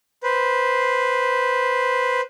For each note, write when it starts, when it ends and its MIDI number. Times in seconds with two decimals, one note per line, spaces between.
0.23 2.21 71
0.23 2.21 72